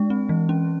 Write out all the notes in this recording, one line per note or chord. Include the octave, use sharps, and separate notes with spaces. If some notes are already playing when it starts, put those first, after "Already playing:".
Already playing: G#3 D4
C4
E3
C#4